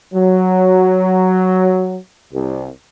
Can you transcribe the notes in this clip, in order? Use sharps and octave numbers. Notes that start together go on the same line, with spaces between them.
F#3
C2